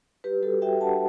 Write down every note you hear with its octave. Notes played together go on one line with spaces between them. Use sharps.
G3 G4 B4
G3 F#4 A4
F#4 E5 G5
D4 F#5 A5